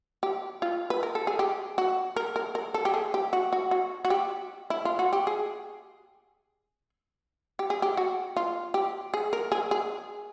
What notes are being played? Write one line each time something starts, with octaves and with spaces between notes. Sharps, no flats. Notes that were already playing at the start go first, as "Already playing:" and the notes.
G4
F4
B4
A#4
A4
G#4
G4
F#4
A#4
A#4
A#4
A4
G4
G#4
G4
F#4
F#4
F#4
F#4
G4
E4
F4
F#4
G4
G#4
G4
G#4
G4
F#4
F4
G4
G#4
A#4
G#4
G#4